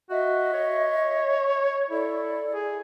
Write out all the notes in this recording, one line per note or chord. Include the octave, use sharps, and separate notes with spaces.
F#4 D#5 E5
C#5
E4 A4 D5
G#4